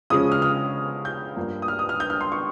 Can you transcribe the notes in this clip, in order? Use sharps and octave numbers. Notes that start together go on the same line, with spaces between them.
C#3 F3 G#3 C#4 D#6
F6
F6
G6
G2 F3 A#3
D#6
F6
D#6
F6
G6
F6
C6
C#6